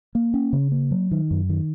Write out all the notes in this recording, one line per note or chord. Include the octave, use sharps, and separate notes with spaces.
A#3
C#4
C#3
A#3
F#3
D#3
F#2
D#3